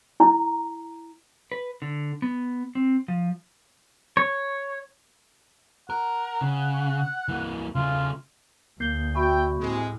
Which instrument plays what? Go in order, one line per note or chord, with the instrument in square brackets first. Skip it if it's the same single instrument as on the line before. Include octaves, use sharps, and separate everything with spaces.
[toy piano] E4 A#5
[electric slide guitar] B4
D3
B3
C4
F3
[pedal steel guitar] C#5
[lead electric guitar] A#4 [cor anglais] F#5
[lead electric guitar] C#3
E3 A#3
[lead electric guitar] C#3 A3 [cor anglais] F4
[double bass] D2 [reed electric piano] A#3 G6 [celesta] C7 G7
[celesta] F#4 B5 C#6 [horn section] E5 G5
[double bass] A2 [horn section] C3 G#3